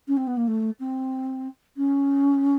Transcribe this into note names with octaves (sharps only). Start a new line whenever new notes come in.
C#4
C4
B3
A#3
A3
C4
C#4